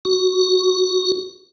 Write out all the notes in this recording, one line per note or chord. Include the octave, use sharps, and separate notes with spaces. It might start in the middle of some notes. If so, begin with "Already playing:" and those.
F#4